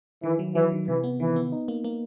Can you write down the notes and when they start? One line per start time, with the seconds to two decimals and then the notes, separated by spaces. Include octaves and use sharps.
0.23 D#3 E3
0.39 F#3
0.55 E3 F#3
0.72 D#3
0.88 C3 E3
1.04 B3
1.20 D#3 E3
1.36 B3
1.52 D#4
1.68 A#3
1.84 A#3